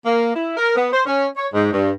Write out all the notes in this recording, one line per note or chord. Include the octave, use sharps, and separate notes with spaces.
A#3
E4
A#4
B3
C5
C#4
C#5
G#2
G2